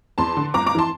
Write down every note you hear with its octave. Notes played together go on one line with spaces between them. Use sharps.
E2 A5 C6
D3
G1 A#5 D6
A#5 D6
E3 A5 C6